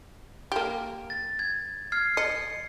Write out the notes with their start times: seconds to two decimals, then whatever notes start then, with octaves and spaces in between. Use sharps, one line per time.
0.52 A#3 G4
1.10 A6
1.39 G#6
1.92 F6 G#6 C7
2.17 D#5 C#7